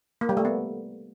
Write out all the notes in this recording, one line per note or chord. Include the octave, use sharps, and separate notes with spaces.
A#3
G3
A3
B3